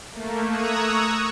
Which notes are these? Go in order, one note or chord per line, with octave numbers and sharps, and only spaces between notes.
A3 A#3
A#5 C#6 D#6 E6 F#6 G#6